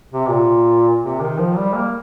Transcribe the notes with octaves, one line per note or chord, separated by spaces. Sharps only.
C3
A#2
C3
D#3
F3
G3
A#3